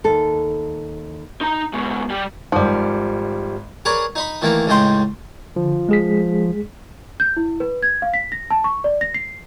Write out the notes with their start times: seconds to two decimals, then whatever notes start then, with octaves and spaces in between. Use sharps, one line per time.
0.04 D#2 A4
1.41 D#4 A#5
1.73 G#2 B2
2.10 G3 G4
2.52 G#1 G#2 F3 G3
3.85 G#4 A#4 B4 C#5 D5
4.15 D#4 D#5 B5
4.42 D#3 E3 A3 A#3 A#5
4.67 C#2 A2 C#3 D#4 G5 C6
5.56 D3 F3
5.89 G#3 G#4 B6
7.20 G6
7.37 E4
7.60 B4
7.83 G#6
8.02 F5
8.14 B6
8.32 A#6
8.50 A5
8.64 C#6
8.84 D5
9.01 A#6
9.14 C7